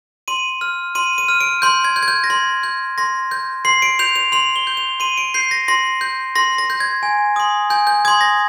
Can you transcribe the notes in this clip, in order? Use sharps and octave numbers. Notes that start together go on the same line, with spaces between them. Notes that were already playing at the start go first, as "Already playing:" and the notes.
C6 D#7
F6
C6 D#7
D#7
F6
D7
C6 G6
G#6
G6
G#6
G6
A#6
C6 G#6
G6
C6 A#6
G6
C6 C7
D7
G6 F7
F7
C6 F7
G7
G6
F7
C6 D#7
D7
G6 C7
A#6
C6 A#6
G6
C6 A#6
A#6
G6
G#6
G#5
C6 D#6
G#5 G6
G6
C6 D#6 G#6
A#6